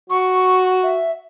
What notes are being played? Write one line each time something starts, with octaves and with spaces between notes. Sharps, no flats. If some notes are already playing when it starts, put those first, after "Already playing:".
F#4 C#6
E5